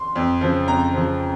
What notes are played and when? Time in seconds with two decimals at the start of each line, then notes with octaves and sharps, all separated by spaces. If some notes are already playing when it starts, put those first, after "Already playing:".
Already playing: C6
0.16 F2
0.41 C#3 F3
0.67 F2 A#5
0.93 C#3 F3